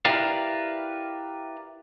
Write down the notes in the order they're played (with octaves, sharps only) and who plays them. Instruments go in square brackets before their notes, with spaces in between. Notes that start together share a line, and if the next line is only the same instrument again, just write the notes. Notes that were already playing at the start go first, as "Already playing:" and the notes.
[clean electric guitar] E4 G4 A#4 B4 D5 F5